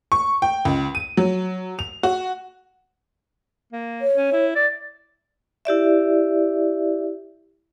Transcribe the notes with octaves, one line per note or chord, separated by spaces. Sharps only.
C#6
G5
C#2
D#7
F#3
F7
F#4
A#3
C#5
C#4
E4
D5 A6
E4 G4 D5 E5